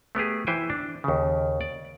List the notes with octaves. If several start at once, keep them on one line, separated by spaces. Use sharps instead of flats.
A3 B3 G4 G#4
E3 E4 C5 G5 G#5
D4
D#2 C#3
D5